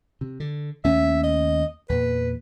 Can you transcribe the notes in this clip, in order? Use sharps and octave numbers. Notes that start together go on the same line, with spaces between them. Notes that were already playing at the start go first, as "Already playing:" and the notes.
C3
D3
D#2 A3 C#4 E5
D#5
E2 A#2 B4